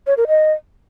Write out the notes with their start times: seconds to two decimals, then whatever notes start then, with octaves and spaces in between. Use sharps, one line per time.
0.07 C#5
0.17 A#4
0.28 D#5